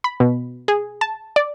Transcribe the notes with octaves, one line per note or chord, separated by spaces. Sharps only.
B5
B2
G#4
A5
D5